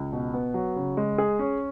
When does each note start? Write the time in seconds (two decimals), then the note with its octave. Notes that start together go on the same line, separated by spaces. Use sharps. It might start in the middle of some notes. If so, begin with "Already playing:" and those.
Already playing: C#2
0.12 B2
0.34 B3
0.54 F#3
0.76 C#3
0.97 G#3
1.18 G#4
1.39 C#4